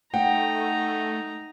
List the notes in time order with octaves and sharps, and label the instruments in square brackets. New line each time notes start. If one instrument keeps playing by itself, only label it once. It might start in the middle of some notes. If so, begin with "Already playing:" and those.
[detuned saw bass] A3 [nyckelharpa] D#4 A#5 [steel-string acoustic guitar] F#5 [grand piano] G5